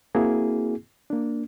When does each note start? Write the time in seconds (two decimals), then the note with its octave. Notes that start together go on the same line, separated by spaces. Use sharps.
0.15 A#3 C4 E4 F#4 G#4
1.10 A#3 D4